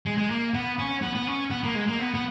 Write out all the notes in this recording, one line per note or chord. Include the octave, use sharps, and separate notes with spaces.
G#3
G#3
A#3
B3
C#4
B3
B3
C#4
B3
A#3
G#3
A#3
B3
B3